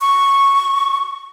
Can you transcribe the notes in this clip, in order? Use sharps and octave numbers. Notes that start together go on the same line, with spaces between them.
C#6